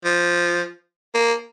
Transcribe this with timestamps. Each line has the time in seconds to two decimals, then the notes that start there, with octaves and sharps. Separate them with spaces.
0.04 F3
1.15 A#3